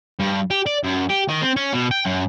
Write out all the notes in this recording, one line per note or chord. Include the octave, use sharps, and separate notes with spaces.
G2
G4
D5
F#2
G4
D#3
C4
C#4
B2
G5
F#2